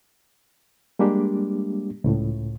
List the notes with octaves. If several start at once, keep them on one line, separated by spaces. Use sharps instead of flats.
G3 G#3 A#3 D4 G4
C#2 A2